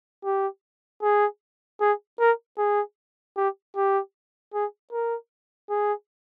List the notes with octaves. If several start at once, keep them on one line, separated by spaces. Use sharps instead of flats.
G4
G#4
G#4
A#4
G#4
G4
G4
G#4
A#4
G#4